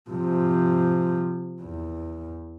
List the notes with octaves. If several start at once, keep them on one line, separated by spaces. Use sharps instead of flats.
C3 F3
E2